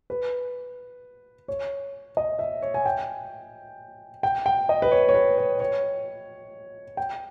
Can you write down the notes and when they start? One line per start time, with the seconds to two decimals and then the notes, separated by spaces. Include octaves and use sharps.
0.10 B4
1.48 C#5
2.17 D#5
2.39 E5
2.62 C#5
2.74 G#5
2.86 G5
4.23 G5
4.46 G5
4.69 D#5
4.82 B4
4.92 C#5
5.09 C#5
5.15 B4
5.38 C#5
5.60 C#5
6.97 G5